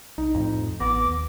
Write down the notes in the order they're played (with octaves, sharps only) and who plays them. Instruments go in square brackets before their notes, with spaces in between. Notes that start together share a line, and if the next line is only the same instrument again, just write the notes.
[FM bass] C2 [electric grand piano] D#4
[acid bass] F2 [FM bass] A2
[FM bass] A1 [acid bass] B3 [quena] D6 [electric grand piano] A#6
[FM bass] D#2